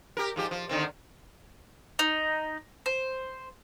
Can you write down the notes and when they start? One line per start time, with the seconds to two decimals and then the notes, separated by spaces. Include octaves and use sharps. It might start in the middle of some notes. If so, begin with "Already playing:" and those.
0.17 G4 A#4
0.36 G#2 F3 G4
0.51 F3
0.69 D3 D#3 C4
1.99 D#4
2.86 C5